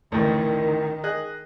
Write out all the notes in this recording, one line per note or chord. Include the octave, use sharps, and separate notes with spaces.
A1 D2 A2 D#3
G#4 D#5 F#6